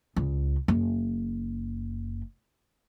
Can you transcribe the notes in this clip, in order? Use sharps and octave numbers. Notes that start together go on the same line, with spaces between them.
C#2
F#1